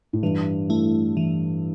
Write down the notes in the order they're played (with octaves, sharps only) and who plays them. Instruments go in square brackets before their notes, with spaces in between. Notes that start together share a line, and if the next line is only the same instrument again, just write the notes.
[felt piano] A2
[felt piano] G2 [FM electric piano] E3
[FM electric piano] A3 E4
E3